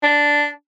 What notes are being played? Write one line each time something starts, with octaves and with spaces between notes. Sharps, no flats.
D4